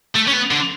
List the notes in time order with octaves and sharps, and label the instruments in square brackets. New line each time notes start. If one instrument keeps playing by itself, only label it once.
[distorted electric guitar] A3
C#4
B3
D3